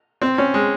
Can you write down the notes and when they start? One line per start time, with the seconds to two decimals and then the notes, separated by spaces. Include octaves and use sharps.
0.22 C4
0.38 C#4
0.54 G#3